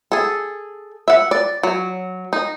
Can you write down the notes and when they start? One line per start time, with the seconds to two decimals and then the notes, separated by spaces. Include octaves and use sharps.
0.12 G#4 A4
1.08 E5 F#5
1.31 D5
1.63 F#3
2.33 D#4